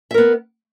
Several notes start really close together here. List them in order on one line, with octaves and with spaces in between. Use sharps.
E5 A#4 B3